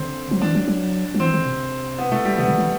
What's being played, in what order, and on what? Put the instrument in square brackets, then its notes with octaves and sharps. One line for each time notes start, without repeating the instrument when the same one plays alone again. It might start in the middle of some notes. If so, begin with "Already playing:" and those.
Already playing: [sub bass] D3 [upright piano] C4
[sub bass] F#3
[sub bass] E3 [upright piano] D4
[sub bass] F#3
F#3
F#3
[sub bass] E3 [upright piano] C4
[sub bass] D3
C3
[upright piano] B3
A3
G3
[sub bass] C3 [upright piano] B3
[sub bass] D3
E3